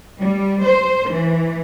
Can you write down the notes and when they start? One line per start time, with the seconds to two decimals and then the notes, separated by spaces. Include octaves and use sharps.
0.19 G3
0.63 C5
1.11 E3